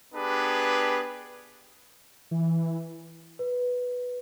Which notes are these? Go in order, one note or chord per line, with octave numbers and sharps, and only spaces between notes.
B3 D4 G4 G#4 B4
E3
B4